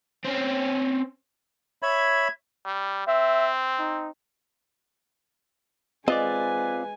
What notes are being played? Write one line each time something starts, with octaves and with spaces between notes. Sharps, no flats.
C4 C#4
C#5 E5 B5 G#6
G3
C4 E5
D#4
G#3 C4 F4 B4 D5 D#5 G#5